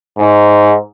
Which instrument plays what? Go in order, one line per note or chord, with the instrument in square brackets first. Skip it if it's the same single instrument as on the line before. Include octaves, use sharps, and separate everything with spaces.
[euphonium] G#2